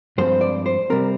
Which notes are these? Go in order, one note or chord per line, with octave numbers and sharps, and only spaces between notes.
G2 F3 G#3 C4 C5
D5
C5
C3 G3 C4 A#4